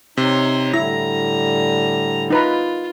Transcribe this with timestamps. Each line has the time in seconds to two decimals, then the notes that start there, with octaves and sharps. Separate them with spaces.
0.17 C3 D#4 C#5 C6
0.74 A2 D3 G3 E4 A#5 A#6
2.30 D#4 F4 B4 A#5